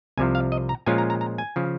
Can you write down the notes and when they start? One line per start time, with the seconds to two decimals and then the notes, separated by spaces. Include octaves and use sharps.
0.17 C2 C3 F3 G#5
0.35 F5
0.52 D#5
0.69 A#5
0.86 A#2 F3 G#3 C#4 F4 G#5
0.98 A#5
1.10 A#5
1.21 A#5
1.38 G#5
1.56 C#3 F3